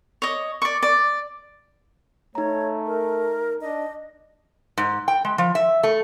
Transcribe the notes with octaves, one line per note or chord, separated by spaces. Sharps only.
C#5 D#5
D5 C#6
D5
A3 D#4 C#5 A#5
A#4
D4 D#5
G#2
G5
G#3
F3
E5
A3